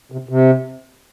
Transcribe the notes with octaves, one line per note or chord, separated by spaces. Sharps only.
C3
C3